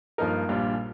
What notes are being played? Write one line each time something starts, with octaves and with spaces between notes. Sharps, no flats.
G2 F3 A#3 D#4 A#4
A#1 A#2 G3 D4 F4